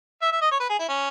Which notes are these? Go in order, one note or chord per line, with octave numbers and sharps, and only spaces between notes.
E5
E5
D#5
C#5
B4
G#4
E4
C#4